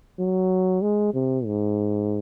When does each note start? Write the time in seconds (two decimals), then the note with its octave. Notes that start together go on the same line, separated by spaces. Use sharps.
0.19 F#3
0.82 G#3
1.14 C3
1.45 G#2